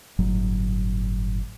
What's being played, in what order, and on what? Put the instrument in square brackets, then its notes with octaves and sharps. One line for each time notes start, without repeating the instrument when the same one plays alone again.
[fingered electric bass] G1 A2 F#3